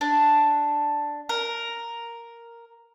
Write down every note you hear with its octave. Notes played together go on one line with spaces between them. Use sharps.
D4
A#4